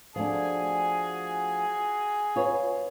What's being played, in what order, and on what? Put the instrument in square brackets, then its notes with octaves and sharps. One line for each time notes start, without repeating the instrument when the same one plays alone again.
[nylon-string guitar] F3 A3 D4 [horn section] F#4 G#4 G#5
[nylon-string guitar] F4 B4 C#5